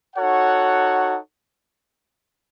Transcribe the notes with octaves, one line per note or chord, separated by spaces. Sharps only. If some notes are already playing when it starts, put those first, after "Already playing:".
D#4 F#4 A4 C#5 F#5